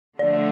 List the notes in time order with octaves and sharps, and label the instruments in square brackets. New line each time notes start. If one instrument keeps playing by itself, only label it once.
[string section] D3 F3 A3 [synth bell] D5